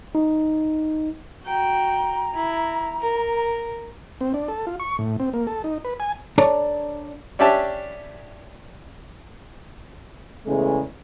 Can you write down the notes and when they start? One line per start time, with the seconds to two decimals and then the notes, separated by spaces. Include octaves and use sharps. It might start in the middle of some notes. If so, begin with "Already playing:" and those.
0.15 D#4
1.46 F#4 G5 A#5
2.35 E4
3.01 A#4
4.21 C4
4.34 D4
4.48 A4
4.67 F4
4.80 C#6
4.99 A2
5.20 C4
5.33 A#3
5.47 A4
5.64 D#4
5.85 B4
6.00 G#5
6.38 D4 A4 C#5 D5 A#5
7.39 C#4 D4 G4 E5 A5
10.46 E2 C#3 G#3 A3